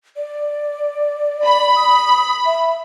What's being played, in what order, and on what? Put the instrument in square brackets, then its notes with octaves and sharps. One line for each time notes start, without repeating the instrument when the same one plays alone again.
[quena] D5
[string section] B5
[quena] D#6
E5